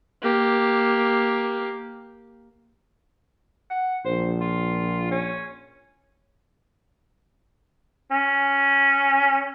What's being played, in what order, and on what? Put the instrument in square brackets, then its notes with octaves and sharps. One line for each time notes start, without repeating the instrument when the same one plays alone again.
[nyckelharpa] A#3 G4
[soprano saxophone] F#5
[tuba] A#1 [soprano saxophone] C5
[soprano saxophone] F4
C#4
[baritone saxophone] C#4